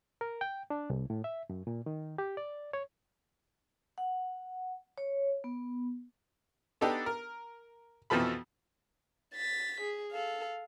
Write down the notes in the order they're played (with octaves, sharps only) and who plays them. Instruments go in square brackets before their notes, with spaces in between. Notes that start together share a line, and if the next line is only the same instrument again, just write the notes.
[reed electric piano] A#4
G5
D4
C2
A2
E5
F#2
A#2
D#3
G4
D5
C#5
[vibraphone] F#5
C#5
B3
[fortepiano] B3 D4 D#4 G4 A4
A#4
F2 B2 E3 F3 A4 B5
[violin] A6 B6
G#4
A4 F5